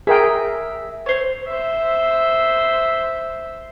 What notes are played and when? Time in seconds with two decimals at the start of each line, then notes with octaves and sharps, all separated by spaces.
0.07 G#4 A#4 E5 G5
1.06 C5 C#5
1.48 C5 E5